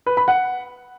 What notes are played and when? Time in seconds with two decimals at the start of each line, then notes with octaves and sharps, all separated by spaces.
0.06 B4
0.17 B5
0.28 F#5